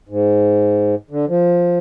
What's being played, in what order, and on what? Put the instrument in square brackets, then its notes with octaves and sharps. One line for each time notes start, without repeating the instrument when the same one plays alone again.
[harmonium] G#2
D3
F3